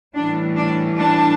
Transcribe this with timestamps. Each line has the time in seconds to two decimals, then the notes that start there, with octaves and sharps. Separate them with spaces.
0.14 A2 E3 G3 D4
0.56 D4
0.98 D4